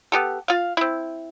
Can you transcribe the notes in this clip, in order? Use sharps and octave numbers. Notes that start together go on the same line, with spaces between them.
B3 G4 A4
F4 F5
C4 E4